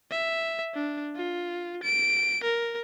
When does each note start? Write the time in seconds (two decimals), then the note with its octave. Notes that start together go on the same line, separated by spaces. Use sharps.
0.11 E5
0.74 D4
1.16 F4
1.83 D7
2.43 A#4